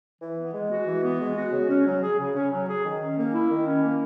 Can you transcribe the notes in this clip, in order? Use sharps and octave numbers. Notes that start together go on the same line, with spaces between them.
E3
B3
G#3
F#4
E3
B3
G#3
F#4
C#3
C#4
F#3
G#4
C#3
C#4
F#3
G#4
D#3
C#4
A#3
E4
D#3
C#4
A#3